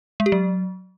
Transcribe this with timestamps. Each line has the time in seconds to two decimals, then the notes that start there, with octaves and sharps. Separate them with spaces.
0.20 G#3
0.26 G4
0.32 F#3